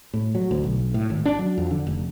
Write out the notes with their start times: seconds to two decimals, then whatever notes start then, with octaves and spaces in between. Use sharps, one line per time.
0.14 A2
0.35 F#3
0.51 D2
0.64 B1
0.94 A2
1.10 G#1
1.26 D4
1.39 F#3
1.58 F2
1.71 D3
1.87 F1